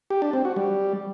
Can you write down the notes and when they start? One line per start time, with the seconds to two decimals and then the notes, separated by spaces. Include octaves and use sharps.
0.10 G4
0.22 D4
0.33 C4
0.45 F#4
0.56 G3